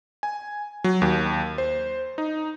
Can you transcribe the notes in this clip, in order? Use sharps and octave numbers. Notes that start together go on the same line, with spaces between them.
G#5
F#3
D#2
C5
D#4